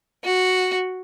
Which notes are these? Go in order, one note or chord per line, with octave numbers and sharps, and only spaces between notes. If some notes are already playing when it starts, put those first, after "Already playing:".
F#4